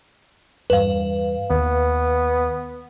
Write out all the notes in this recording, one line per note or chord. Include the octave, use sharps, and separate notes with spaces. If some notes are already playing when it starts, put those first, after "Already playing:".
E2 G2 B4 F5
D#2 B3